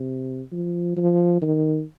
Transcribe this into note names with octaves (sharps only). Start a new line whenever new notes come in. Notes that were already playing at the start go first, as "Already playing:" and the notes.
Already playing: C3
F3
F3
D#3